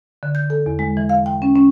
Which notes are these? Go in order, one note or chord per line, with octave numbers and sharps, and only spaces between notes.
D3
G6
A4
E2
G#3
E3
F5
G5
C#4
C#4